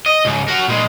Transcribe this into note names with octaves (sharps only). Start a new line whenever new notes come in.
D#5
C#2 G#2
F#4 A#4
A#2 G#3